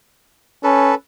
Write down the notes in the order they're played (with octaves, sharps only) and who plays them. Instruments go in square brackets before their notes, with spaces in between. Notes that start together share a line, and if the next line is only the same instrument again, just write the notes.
[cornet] C#4 [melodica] A4 B4